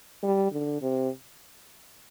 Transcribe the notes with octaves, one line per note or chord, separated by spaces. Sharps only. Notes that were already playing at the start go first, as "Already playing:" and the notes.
G3
D3
C3